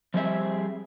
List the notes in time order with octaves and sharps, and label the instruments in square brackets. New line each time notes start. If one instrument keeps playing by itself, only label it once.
[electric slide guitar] F3 G3 C4 G#4 E5